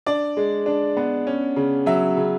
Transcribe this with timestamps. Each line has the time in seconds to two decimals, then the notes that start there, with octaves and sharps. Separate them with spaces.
0.06 D4 D5
0.37 G#3
0.66 D4
0.97 B3
1.27 C#4
1.56 C#3
1.86 F#3 E5
2.17 C#3